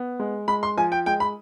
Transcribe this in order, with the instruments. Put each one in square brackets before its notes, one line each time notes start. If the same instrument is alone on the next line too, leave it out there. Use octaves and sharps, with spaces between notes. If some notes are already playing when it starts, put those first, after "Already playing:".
Already playing: [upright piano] B3
G#3
G#3 B5
C6
F3 G#5
G5
G#3 G5
B5